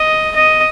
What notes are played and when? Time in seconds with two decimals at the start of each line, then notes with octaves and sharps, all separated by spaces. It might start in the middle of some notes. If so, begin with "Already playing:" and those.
Already playing: D#5
0.36 D#5